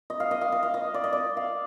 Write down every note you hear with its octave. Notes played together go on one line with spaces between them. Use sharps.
D#5
F5
D#5
F5
D#5
F5
D#5
D5
D#5
D5
F5